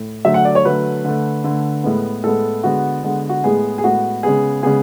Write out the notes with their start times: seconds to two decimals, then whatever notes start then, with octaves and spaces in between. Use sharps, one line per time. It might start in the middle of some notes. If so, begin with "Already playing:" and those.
Already playing: A2
0.25 D3 F#3 A3 E5
0.34 F#5
0.45 D5
0.55 C#5
0.65 D3 F#3 A3 B4
1.05 D3 A3
1.44 D3 A3
1.84 A2 G#3 B3
2.24 A2 G#3 B3 A4
2.63 D3 G#3 B3 F#4
3.03 D3 G#3 B3
3.29 F#4
3.44 A2 G#3 B3 G#4
3.78 G#4
3.83 A2 G#3 B3 F#4
4.23 C#3 G#3 B3 G#4
4.63 C#3 G#3 B3 G#4